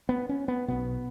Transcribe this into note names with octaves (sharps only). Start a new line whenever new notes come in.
B3
C#4
B3
B1 B2 B3